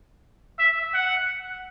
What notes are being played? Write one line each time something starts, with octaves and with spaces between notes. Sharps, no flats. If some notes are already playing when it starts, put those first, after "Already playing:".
E5
F#5